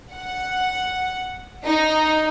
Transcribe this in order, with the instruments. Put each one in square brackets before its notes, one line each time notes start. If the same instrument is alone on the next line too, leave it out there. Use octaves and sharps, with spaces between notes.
[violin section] F#5
D#4